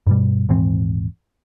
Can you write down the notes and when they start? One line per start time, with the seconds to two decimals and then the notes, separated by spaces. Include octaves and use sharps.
0.07 G2 B2 G3
0.49 D#1 G#2 E3 C4